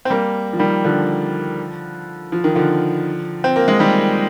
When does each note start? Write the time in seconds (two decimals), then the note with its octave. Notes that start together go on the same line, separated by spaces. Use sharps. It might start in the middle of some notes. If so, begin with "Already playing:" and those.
0.05 C4
0.10 G3 A#3
0.53 F3
0.59 D#3 G3
0.84 D3 F3
2.32 F3
2.44 D#3
2.55 D3 F3
3.44 C4
3.56 A#3
3.68 G#3
3.80 D#3 G3